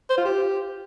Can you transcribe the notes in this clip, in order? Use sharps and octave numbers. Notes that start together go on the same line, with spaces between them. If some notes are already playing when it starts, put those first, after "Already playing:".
C5
F4
G4